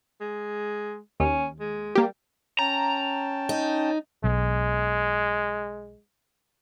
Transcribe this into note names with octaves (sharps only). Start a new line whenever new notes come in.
G#3
D#2 C#4
G#3
G3 A#3 G4
C#4 G5 A5 A#5
D#4
B1 G#3